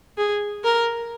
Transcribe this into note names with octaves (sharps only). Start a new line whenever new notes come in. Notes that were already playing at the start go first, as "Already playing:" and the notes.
G#4
A#4